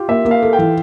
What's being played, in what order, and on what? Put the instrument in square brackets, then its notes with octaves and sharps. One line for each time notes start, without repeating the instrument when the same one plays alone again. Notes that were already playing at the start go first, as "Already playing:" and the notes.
Already playing: [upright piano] F4 G4
[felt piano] A#3 [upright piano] E5
[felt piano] A#3
[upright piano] F5
[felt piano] A4
[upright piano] G5
[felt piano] E3